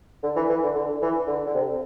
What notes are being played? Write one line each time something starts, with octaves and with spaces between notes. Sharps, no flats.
D3
E3
E3
D3
D3
E3
D3
D3
C3